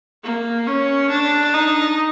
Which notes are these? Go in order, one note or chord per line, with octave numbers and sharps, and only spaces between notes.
A#3
C#4
D4
D#4